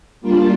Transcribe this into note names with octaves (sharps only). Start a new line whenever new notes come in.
G3 A#3 D4 F4